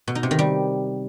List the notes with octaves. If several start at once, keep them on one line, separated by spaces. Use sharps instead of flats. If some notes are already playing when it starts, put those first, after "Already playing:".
B2
D#4
C3
D#3
G3